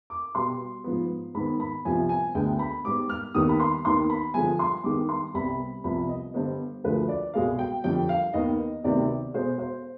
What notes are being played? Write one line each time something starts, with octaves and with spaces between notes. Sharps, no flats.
D6
B2 G3 B3 C6
G#2 F3 B3
G#2 D#3 B3 B5
B5
C2 C3 F3 B3 G#5
G#5
D2 D3 G#3 B3 G5
B5
G#2 G3 B3 D6
F6
D#2 D#3 G3 B3 D#6
B5
C6
D#2 D#3 B3 C6
B5
G2 D3 F3 G#3 G#5
C6
G2 D#3 G#3 B3 D6
C6
C2 C3 G3 B3 B5
C2 C3 F3 B3 B5
D#5
G2 D3 G3 B3 C5
D2 D3 F3 G#3 B4
D5
C2 B2 G#3 B3 F5
G5
F2 D3 G3 G5
F5
D#2 D#3 B3 D#5
D2 C3 D#3 B3 D5
B2 G#3 B3 C5
C5